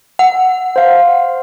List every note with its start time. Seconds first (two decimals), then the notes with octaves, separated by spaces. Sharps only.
0.19 F#5
0.76 C5 F5